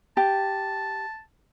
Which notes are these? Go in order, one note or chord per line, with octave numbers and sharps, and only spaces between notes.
G4 A5